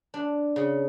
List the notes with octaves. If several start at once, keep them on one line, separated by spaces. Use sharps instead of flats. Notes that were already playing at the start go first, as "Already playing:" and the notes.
D4
C#3